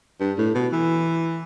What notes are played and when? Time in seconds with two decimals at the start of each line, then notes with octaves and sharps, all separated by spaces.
0.20 G2
0.38 A2
0.55 B2
0.72 E3